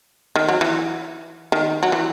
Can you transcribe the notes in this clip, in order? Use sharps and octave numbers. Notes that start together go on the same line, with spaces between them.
D#3
F#3
E3
D#3
F#3
E3